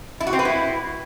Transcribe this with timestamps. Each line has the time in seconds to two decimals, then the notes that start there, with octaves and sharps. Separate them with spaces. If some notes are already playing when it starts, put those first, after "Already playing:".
0.20 E4
0.27 F#4
0.33 C4
0.39 B4
0.45 E4